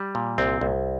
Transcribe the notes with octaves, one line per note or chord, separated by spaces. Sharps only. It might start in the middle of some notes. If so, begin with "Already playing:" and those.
Already playing: G3
A#2
C2 C4
C2